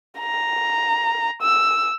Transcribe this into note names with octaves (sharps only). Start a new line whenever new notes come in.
A#5
E6